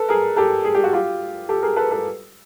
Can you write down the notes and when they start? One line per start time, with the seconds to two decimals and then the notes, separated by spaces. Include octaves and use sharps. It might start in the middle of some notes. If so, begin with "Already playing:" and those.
Already playing: A4 B4
0.09 G#4 A#4
0.36 G4 A4
0.64 G#4
0.75 G4
0.84 F#4
0.93 F4 G4
1.49 G4 A4
1.62 G#4 A#4
1.76 A4 B4
1.91 A4 B4